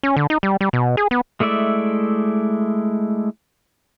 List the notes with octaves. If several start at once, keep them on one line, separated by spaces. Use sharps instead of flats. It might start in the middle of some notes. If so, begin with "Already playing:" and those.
C#4
D3
D#4
G3
G3
B2
G#4
B3
G#3 A3 E4 D5 E5